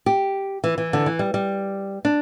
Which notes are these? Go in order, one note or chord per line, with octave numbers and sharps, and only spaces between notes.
G4
E3
E3
D3
E3
G3
G3
D4